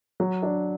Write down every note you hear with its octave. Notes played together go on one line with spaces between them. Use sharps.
F#3
D4